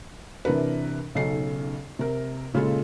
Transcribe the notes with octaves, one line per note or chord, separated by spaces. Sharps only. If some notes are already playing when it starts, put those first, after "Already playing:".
C3 E3 D4 A#4 B4
B1 C#3 C#4 D#4 A4 C7
C3 A#4
A#2 C#3 G#3 F4 A4